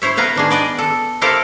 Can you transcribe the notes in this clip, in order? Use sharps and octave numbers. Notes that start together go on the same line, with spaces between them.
E4 C5 C#5 E5
B3 B4 F5 A#5
D#3 D4 G#4
B3 D5 D#5
A4
E4 G4 A4 A#4 C5 F5